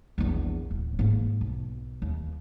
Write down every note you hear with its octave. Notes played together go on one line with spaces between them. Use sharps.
A#1 E2
D1
G#2 A#3
B1
D#2